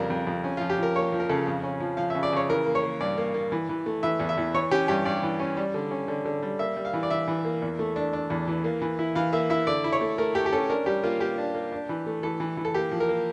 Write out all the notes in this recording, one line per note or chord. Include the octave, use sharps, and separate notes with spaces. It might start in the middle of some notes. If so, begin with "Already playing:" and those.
Already playing: F2 C#3 G3 D4 A#4
F2
F2
C#4
F3 F4
G4
F3 A#4
A#3 C#5
F3
A#4
C#3 A4
F2
C#4
F3
F3 F5
C#3 E5
D5
C#3 C#5
E3 A#4
A#3
C#5
A#3
G2 D5
A#3
A#3
E3
E3
A3
E3 E5
E2
E5
E2
E3 C#5
C#4 G4
G2 G4
G2 D5
E3
C#4
G3
D3
C#4
D3
D3
G3
A#3 E5
G3
F5
E3
D5
E3 E5
E3
A#3
E2
A3
D4
D4
E2
E3
A#3
E3
E4
E3 F5
A#3 E5
E4 E5
D3 D5
E4
C#5
A3
A3 A#4
A3 G4
G4
C#4 A4
D4 A#4
G3 G4
A#3 F4
A#3 G4
D4
A#3
D4
E3
A3
E3 A4
E3
E3
A4
A#3 G4
F3
A#4
A#3